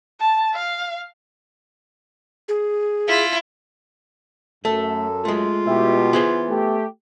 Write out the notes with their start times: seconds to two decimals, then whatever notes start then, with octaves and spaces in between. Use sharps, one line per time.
0.20 A5
0.54 F5
2.48 G#4
3.08 E4 F4
4.65 F#2 A3 A4
5.25 G#3 A3 F4
5.67 B2 E4 G4
6.13 E3 B3 G#4 C5
6.49 A3 G4